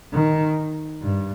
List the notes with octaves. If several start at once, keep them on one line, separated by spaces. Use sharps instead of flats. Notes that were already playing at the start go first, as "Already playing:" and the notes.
D#3
G2